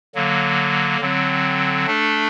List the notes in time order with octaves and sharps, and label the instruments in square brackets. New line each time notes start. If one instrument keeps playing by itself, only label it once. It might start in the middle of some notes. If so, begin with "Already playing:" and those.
[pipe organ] D3 F#3 A#3
D3 F#3 C4
A3 D4 A4